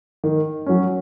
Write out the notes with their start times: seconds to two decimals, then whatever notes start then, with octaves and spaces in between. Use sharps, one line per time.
0.24 D#3
0.66 F#3 C#4